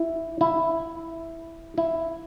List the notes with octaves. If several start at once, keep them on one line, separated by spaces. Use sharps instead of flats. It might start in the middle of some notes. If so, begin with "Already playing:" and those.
Already playing: E4
E4
E4